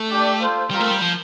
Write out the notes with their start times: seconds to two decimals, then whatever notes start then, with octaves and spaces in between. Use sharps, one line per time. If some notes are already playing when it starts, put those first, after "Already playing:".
Already playing: A3
0.08 D4 G4 D5 G5
0.39 F4 A4 C5
0.70 G3 C4 F4 A#4
0.80 A3
0.91 G3
1.01 F3